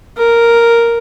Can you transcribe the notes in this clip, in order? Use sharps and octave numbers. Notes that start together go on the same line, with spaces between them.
A#4